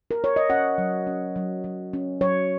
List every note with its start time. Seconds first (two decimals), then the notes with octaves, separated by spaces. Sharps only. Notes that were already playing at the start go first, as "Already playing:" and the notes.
0.11 A#4
0.24 C#5
0.36 D#5
0.50 C#4 F#5
0.78 F#3
1.07 C#4
1.36 F#3
1.64 F#3
1.93 C#4
2.21 F#3 C#5